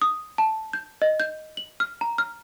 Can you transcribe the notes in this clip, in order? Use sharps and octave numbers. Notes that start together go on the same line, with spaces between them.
D#6
A5
G6
D#5
G6
F#7
F6
A#5
F6